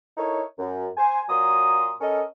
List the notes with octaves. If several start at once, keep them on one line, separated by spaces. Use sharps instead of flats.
D#4 E4 A4 A#4 C#5
F#2
C5 G#5
A#2 F#3 A#5 C6 D#6
C#4 A4 A#4 D#5